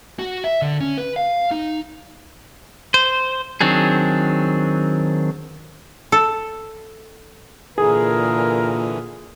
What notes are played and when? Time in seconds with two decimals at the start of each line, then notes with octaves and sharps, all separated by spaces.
0.19 F#4
0.44 E5
0.62 D3
0.80 C#4
0.97 B4
1.16 F5
1.51 D#4
2.94 C5
3.61 D#3 F#3 C4 D4 G#4
6.12 A4
7.78 A#2 D3 E3 G#4 A#4